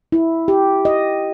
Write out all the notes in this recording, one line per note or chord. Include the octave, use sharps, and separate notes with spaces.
E4
G4
D#5